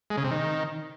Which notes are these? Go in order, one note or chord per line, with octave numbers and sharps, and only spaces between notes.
G#3
C#3
C3
D#3